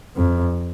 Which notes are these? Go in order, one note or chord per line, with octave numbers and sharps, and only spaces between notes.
F2